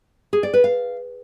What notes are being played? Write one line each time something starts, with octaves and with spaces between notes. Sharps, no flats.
G#4
D5
B4
F5